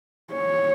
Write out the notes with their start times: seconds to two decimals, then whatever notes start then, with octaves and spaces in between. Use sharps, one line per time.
0.34 C#5